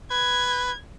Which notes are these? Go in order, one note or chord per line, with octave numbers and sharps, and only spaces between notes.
B4 G#6